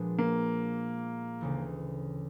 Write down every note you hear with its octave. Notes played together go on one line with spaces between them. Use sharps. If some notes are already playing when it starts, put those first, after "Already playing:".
Already playing: A#2 F3 G#3 B3 D4
A#3
D2 C#3 E3